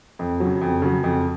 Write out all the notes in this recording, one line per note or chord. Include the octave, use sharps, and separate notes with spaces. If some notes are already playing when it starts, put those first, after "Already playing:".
F2
F#3
C#3
F2
C#3 F#3
F2